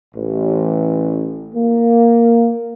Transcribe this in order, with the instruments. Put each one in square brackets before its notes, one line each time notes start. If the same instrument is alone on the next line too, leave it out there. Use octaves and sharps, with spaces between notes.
[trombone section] A1
A#3